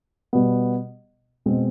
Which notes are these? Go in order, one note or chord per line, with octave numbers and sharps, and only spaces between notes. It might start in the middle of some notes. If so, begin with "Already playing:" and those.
B2 G3 B3
B2 G#3 C4